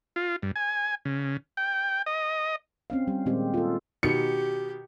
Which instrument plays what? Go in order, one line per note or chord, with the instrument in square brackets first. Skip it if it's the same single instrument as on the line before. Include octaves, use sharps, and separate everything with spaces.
[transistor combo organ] F4
G2
G#5
C#3
G5
D#5
[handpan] C4 C#4 F5
G3
A#2 D#3 G#3 C4 G4
F4 A4
[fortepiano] B2 D#3 [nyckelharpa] G4 [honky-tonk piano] C#7